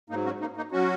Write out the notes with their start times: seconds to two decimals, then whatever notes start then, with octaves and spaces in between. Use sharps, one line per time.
0.09 G#2 F#3 A#3 D#4
0.25 C#4 F#4
0.40 A#3 D#4
0.57 A#3 D#4
0.72 F#3 C#4 F#4